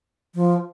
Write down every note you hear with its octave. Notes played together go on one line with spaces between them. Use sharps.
F3